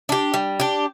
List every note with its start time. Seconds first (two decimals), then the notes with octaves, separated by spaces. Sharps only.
0.09 D4 G4
0.34 G3
0.60 D4 G4